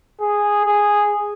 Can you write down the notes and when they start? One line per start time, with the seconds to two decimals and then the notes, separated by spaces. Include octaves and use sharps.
0.21 G#4
0.65 G#4